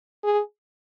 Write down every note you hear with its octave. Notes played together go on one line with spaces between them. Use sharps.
G#4